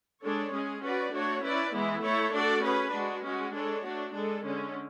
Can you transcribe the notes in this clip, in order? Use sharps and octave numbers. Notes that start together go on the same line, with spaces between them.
G#3 D4 A4 C#5
G#3 C#4 G#4
C#4 F#4 B4 D5
A3 D4 F#4 C#5
C#4 E4 B4 D5
E3 G#3 B3 E4
A3 E4 A4 C#5
A3 D4 F#4 A4 D5
C#4 G#4 B4
G#3 D4 F#4
G#3 C#4 F#4
G#3 D4 A4 C#5
A3 D4 F#4
G#3 D4 A4
D3 G#3 C#4